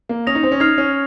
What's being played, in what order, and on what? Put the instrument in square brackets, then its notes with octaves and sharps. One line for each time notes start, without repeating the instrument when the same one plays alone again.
[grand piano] A#3
[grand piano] C#4 [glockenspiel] D#6 A#6 F7
[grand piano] D#4
C4
C#4
[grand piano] D#4 [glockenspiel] F6 G#6 C7 F7
[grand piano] C#4